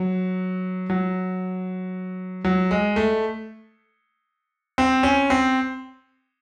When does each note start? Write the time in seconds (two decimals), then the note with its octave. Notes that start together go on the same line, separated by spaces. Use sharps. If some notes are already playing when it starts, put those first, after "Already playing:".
Already playing: F#3
0.90 F#3
2.44 F#3
2.71 G#3
2.96 A3
4.78 C4
5.03 C#4
5.30 C4